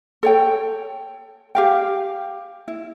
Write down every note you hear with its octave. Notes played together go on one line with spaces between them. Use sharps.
A4 C#5 G5
G4 F5 G5
E4